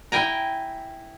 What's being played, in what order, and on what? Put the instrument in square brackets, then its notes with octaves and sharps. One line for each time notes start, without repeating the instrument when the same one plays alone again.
[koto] E4 G5 G#5 A#5